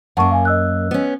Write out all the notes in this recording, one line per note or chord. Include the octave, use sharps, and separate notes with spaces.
F#2 A#3 F#5 A5 C#6
F5 G#5
D#5 E6 F#6
B3 C#4